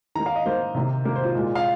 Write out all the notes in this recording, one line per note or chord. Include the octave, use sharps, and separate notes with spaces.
D#3 A#3 A#5
F5
D#5
D#3 A#3 C5
C3 D#3 A#3
C3 D#3 A#3
C5
F4
A#2 G#3
F5